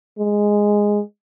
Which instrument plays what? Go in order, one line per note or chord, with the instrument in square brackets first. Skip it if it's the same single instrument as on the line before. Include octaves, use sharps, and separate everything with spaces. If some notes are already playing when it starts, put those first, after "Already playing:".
[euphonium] G#3